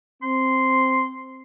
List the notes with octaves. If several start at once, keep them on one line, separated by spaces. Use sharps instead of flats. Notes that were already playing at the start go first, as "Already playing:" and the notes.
C4 C6